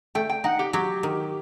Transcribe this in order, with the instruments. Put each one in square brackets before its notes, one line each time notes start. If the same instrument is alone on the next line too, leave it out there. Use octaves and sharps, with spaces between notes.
[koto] A3 [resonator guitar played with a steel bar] G5
[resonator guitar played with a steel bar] G5
[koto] D#4 [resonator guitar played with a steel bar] F#5
[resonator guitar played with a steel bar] G4
[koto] F#3 [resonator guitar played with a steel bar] G4
[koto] D#3